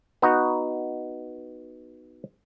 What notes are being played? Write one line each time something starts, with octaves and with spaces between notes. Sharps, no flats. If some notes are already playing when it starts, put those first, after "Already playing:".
B3 D#4 F#4